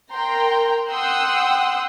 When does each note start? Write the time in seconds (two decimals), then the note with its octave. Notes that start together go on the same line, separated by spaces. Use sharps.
0.13 A#4 G5 A#5 C6
0.90 F#5 G5 C6 D#6 E6 F#6